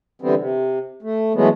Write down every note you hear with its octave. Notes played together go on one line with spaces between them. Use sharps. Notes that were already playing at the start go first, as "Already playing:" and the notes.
D3 E3 G3 B3 C4
C3
A3
E3 F#3 G#3 A3 B3